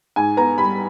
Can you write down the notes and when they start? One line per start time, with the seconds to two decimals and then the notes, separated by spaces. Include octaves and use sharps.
0.16 G#2 G#5
0.37 B3 A#5
0.58 G3 B5